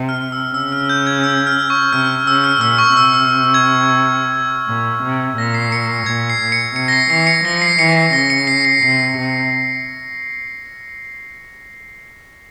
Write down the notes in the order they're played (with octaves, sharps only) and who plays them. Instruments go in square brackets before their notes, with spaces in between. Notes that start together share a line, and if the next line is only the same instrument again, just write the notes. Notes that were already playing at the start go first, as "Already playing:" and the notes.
Already playing: [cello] C3
[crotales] F6
E6
[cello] C#3 [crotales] E6
[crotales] F6
G6
G#6
E6
F6
C#6
[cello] C3 [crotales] F6
[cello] C#3 [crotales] E6
[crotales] F6
[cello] A#2 [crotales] E6
[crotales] C#6
[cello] C3 [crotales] E6
[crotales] E6
G#6
[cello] A#2
C3
[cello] A#2 [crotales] A#6
[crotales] C7
C#7
C7
[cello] A#2 [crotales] G#6
[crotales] C7
[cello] A#2
[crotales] C#7
[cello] C3 [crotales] C#7
[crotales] A#6
C7
[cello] E3 [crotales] C7
[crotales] C#7
[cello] F3 [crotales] A#6
[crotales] C7
[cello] E3 [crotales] C#7
[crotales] C7
[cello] C#3 [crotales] A#6
[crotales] C#7
C7
C7
[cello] C3 [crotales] C7
[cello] C3